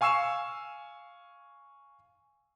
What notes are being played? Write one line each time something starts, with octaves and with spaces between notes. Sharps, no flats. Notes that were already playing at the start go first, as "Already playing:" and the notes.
F5 G#5 C#6 E6 C7 E7